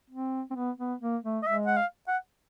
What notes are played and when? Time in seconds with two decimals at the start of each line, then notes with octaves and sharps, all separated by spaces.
0.10 C4
0.51 C4
0.55 B3
0.78 B3
1.01 A#3
1.23 A3
1.43 D#5
1.46 G#3 E5
1.67 F#5
1.77 F5
2.08 F#5